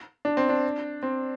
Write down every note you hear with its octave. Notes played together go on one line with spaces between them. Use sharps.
D4
C4
D4
C4